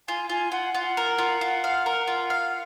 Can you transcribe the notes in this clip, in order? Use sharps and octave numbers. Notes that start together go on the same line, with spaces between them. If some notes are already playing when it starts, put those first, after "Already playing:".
F4 G#5
F4 G#5
F4 F#5
F4 F#5
A#4
F4
F4
F5
A#4
F4
F5